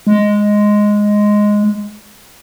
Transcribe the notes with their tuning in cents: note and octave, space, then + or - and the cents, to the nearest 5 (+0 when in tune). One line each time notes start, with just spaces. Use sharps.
G#3 +0